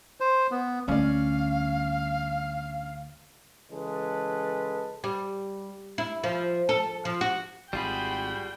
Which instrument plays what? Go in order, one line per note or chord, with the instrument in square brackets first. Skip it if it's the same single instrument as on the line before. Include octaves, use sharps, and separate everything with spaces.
[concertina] C5
B3
[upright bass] D2 G3 [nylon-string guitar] C#4 D5 [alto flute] F5
[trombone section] C#3 E3 G#3 A4 B4
[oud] G3
E4
F3
A4
F3
F#4
[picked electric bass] G#1 [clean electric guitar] G3 F4 G#4 [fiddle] F#4 B5 [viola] G5